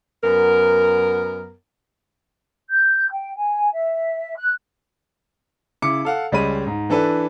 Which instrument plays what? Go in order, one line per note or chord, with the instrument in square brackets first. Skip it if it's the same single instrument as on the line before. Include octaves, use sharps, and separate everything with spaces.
[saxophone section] F#2 B3 A#4
[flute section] G6
G5
G#5
E5
F#6
[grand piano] C#3 E4 D6 C#7
A4 F5 F#5
C#2 G3 G#3 C#5 B5 D#7
G#2
E3 D4 A4 B4